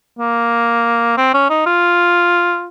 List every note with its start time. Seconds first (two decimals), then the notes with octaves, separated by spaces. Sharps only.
0.19 A#3
1.17 C4
1.34 C#4
1.50 D#4
1.66 F4